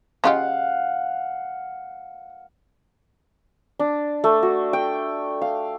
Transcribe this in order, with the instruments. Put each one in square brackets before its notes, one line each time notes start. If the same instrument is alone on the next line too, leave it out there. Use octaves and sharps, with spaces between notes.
[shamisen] C#3 F4 G4 [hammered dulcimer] F5 F#5
[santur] D4
A3
F#4
G5
F5